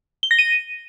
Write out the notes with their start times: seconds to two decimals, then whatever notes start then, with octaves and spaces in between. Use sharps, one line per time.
0.23 G7
0.31 A#6
0.39 D#7